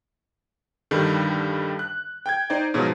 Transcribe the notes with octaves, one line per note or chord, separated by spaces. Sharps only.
G2 D3 D#3 G3
F#6
G5 G6 G#6
D#4 C5 D5
G#2 B2 F3 F#3